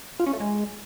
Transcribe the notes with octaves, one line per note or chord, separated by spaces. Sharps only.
F4
C#4
A3
G#3